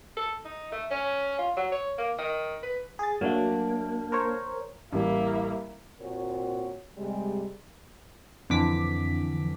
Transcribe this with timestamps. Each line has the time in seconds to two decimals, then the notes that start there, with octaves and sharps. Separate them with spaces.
0.17 A4
0.45 D#4
0.72 A3
0.91 C#4
1.39 F4
1.57 F#3
1.72 C#5
1.98 A#3
2.18 D#3
2.63 B4
2.99 G#4 A6
3.21 F#3 A3 A#3 D4
4.12 A#4 C5 C#5
4.92 A1 G3 A#3 E4
5.99 A#2 C4 F#4 A#4 C#5
6.96 C3 G3 G#3
8.50 F2 D3 E3 D6 B6